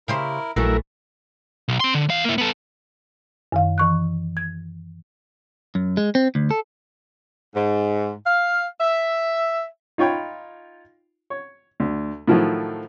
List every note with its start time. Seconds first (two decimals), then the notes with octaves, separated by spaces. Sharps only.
0.08 C#3 E4 G4 A#4 C5
0.56 A#1 D#3 E3 F#3 A3 E4 A4 A#4
1.68 B1
1.80 C4 C6
1.95 D3
2.09 E2 F5
2.24 A#3 E4
2.38 B3 A4
3.52 F#2 D#3 F5
3.78 E3 C#6 F#6
4.37 G#6
5.75 F#2
5.97 G#3
6.15 C4
6.35 D2
6.51 A4
7.55 G#2
8.25 F5
8.81 E5
9.98 D#4 F4 C#5 G5 B5
11.30 C#5
11.80 D2
12.28 A2 D#3 F3 F#3 A3